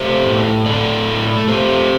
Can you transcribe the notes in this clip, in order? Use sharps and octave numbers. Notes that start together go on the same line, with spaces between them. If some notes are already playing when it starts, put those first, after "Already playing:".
Already playing: A3 G4 C5
A2
A2 A4 D5
A3
A3 G4 C5